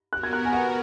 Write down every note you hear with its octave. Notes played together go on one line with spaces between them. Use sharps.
B3 F#4 A#4 F#6
G#6
F#6
G#5
F#5